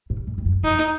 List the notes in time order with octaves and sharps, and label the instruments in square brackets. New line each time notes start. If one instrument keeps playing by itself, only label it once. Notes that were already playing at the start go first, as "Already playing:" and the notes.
[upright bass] G#2
G#2
F2
F#2
[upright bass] F2 [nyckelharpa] D#4